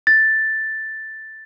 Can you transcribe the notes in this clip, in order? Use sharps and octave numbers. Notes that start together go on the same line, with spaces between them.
A6